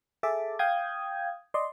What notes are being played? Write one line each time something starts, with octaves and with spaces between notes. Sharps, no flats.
G#4 A4 E5 A5 D6
F5 G5 D#6 G6 G#6
D5 D#5 C6